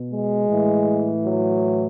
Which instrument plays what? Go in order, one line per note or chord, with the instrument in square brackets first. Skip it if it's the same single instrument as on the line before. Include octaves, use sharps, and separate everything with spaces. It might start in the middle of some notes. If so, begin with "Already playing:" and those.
Already playing: [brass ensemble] B2
G#3
A2 E3
F#3